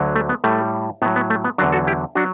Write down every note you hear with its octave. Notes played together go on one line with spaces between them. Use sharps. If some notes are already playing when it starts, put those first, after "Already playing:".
Already playing: D2 D3 F#3
A3
B3
A2 G3 A3
A2 F#3 B3
B3
A3
B3
E2 D3 F#3 D4 F#4
F#4 A4
E4 G4
F#3 D4 F#4